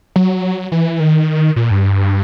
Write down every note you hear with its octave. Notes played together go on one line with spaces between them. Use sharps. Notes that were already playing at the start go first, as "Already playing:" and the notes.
F#3
E3
D#3
A#2
G2